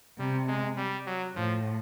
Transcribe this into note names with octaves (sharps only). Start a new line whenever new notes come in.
C3 G3
G#3
G3
F#3
A2 F3